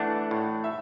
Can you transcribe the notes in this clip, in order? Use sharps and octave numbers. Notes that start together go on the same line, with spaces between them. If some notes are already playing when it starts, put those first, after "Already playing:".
Already playing: E3 A3 D4 F#5
A2
E5